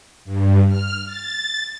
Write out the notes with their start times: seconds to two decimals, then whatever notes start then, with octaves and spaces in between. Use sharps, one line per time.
0.25 G2
0.69 F6
1.06 A6